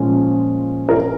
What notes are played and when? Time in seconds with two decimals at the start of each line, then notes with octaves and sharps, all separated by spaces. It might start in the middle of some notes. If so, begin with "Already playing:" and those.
Already playing: A#2 F3 G#3 C#4
0.89 A#4